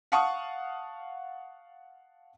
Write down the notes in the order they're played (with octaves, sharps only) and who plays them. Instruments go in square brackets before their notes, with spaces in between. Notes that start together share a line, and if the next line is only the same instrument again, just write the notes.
[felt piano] F5 F#5 A5 C#6 D#6